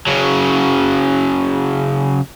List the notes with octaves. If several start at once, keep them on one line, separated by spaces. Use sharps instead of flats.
C#3 F#3